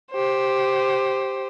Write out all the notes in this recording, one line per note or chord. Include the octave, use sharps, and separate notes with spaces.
G4 C5